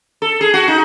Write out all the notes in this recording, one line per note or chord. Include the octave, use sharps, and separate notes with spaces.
A4
G#4
F#4
D#4